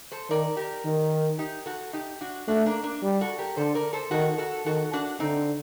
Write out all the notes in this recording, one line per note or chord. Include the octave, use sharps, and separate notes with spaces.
A4 C5
D#3 A#4 D5
G4 A#4
D#3
D#4 G4
F#4 A4
D#4 G4
D4 F#4
A3 D4 F#4
A#3 D4
A#3 D4
G3
F#4 A4
G4 A#4
D3 A4 C5
A#4 D5
A4 C5
D#3 F#4 A4
F#4 A4
D#3 F#4 A4
D4 F#4
D3 C4 D#4